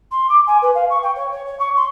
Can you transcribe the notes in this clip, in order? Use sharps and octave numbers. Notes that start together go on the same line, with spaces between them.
C6
D6
G#5
B4
F5
C#6
G5
C#5
C#5
C#5
C#6
C6